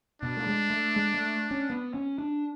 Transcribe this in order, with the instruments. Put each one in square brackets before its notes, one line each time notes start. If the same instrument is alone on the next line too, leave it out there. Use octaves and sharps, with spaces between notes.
[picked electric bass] B2 [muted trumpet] D4
[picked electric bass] A3
G#3
A3
G#3
A3
C#4
B3
C#4
D4